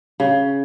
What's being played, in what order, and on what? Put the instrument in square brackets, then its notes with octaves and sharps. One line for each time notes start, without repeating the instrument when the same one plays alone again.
[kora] C#3